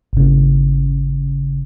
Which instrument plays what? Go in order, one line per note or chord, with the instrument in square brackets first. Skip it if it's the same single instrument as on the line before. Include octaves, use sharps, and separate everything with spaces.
[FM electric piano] G#1 C#3